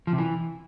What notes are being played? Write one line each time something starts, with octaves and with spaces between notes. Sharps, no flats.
F3
C3
E3